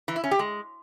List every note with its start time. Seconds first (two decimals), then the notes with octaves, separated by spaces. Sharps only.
0.08 E3
0.16 E4
0.24 C#4
0.31 G4
0.39 G#3